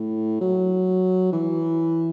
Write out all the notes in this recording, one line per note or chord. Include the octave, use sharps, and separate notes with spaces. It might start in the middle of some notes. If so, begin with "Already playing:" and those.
Already playing: A2
F#3
E3